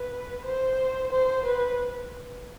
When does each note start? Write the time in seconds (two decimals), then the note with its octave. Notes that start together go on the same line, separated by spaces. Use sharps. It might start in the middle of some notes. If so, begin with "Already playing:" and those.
Already playing: B4
0.45 C5
1.11 C5
1.45 B4